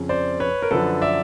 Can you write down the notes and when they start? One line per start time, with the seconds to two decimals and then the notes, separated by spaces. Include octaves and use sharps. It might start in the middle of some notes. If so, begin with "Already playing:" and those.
Already playing: F2 C#3 F3
0.09 C5 D5
0.40 B4 C#5
0.62 A#4
0.71 F#2 D3 F3 A4 B4
1.01 D5 E5